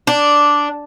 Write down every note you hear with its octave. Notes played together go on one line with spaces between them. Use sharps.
D4